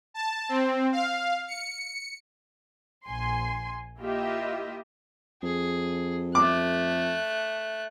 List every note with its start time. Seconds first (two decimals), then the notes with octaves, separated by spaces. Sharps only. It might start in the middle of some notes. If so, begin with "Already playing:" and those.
0.14 A5
0.49 C4
0.92 F5
1.47 C#7
3.06 A#1 G#5 C6 C7
3.98 A#3 E4 F4 G4 D#5 E5
5.43 F2 G#4
6.35 A3 D6 F#6